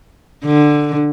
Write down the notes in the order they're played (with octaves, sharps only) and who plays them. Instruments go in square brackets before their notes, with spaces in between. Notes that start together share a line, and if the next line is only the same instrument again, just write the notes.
[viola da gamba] D3